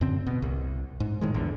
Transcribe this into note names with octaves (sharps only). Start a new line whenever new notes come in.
F#2 D3 C4
B2
C2
G#2
A2 D#3 G#3
A#1 E2 D3